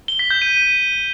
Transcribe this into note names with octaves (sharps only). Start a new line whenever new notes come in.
G7
B6
G6
D#7